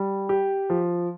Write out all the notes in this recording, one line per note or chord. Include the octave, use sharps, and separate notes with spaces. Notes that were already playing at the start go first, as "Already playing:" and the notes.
Already playing: G3
G4
F3